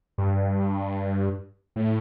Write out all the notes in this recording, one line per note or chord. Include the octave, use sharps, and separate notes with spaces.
G2
A2